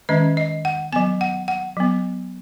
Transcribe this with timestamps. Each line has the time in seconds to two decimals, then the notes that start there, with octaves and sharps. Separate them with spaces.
0.09 D#3 G#3 C#4 D#5
0.37 D#5
0.65 F#5
0.92 F#3 B3 G#5
1.21 F#5
1.48 F#5
1.77 F#3 B3